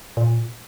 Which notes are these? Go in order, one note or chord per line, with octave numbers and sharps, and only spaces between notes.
A#2